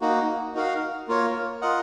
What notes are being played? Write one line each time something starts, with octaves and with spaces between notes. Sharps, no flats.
A#3 D#4 F#4
D#4 F#4 A#4 F5
A#3 F4 A#4 C#5
F4 A#4 D#5 F#5